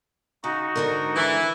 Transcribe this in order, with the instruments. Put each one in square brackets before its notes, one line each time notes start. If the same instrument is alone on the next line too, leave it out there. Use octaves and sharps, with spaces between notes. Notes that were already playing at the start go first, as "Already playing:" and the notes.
[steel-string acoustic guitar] C#3 [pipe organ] D#4 F#4
[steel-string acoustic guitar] G#2 D3 A#4
[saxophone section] E3